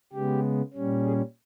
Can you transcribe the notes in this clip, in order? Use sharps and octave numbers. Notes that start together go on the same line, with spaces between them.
C#3 G#3 B3 G4
A#2 G3 C#4
G#4